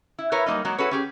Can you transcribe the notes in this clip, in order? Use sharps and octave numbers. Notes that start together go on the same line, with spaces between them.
E4
E4 A#4 B4 C#5
F#3 G3 A#3 D#4 D#5
F#3 G#3 A#3 F#4 A#5
E4 F#4 G#4 A4 B4 C#5
C#4 G4 G#4